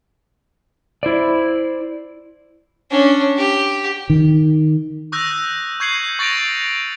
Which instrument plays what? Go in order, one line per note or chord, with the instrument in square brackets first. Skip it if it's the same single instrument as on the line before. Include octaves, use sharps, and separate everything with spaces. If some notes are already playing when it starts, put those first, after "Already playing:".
[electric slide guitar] E4 C5 D5
[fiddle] C#4 D4
G4
[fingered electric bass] D#3
[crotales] C#6 D#6 E6 F#6 G6 A#6
C#6 G6 G#6 C7 C#7 F#7
C#6 A6 A#6 D7 F7